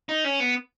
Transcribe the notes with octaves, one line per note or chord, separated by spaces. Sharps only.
D#4
C#4
B3